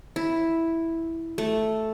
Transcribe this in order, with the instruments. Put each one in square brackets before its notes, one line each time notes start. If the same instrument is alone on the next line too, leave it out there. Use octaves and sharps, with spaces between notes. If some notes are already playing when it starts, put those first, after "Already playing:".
[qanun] E4
A3